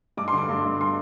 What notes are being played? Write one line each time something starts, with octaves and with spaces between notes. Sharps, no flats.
G2 D6
D3 C6
D6
G2
G2
C6